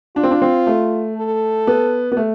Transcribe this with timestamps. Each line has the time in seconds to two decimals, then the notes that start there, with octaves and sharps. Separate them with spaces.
0.16 D4 F4
0.23 C4
0.31 D4
0.42 C4
0.67 A3
1.17 A4
1.67 B3
2.12 B3
2.17 A3